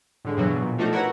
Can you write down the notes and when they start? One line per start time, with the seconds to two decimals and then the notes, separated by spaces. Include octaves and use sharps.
0.25 A2 D3 G#3
0.37 G2 B2 E3 F#3
0.50 B2
0.62 A#2
0.78 F3 A3 D4 D#4 F#4 A4
0.92 E4 F#4 A#4 B4 C#5 F#5